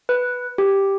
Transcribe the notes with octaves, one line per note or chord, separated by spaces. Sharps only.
B4
G4